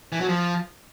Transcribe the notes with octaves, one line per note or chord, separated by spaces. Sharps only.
E3
F#3
F3